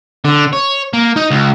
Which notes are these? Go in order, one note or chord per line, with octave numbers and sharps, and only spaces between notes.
D3
C#5
A#3
D#4
C#2